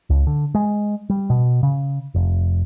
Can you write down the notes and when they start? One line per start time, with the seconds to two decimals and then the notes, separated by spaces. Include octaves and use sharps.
0.10 C#2
0.27 D3
0.54 G#3
1.10 G3
1.30 B2
1.63 C#3
2.14 F1